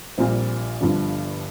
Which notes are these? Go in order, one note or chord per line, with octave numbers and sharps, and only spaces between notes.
A#1 A#2 G3 C4
G1 G2 D3 F3